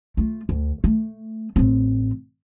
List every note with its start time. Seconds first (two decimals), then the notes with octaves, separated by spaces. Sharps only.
0.17 A3 F4
0.49 D2
0.84 A3
1.56 A1 C4